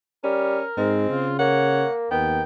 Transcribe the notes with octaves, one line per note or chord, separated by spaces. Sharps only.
G3 C#4 A#4
G#2 G#3 C4
C#3 F4
A#3 C#5 F#5
D#2 D#3 B3 G5